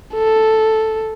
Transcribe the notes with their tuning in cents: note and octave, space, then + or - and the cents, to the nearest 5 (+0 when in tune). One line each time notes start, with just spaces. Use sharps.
A4 +0